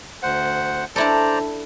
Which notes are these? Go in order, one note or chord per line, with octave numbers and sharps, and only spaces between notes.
D2 C5 F#5
D4 E4 A4 C5 D5 A#5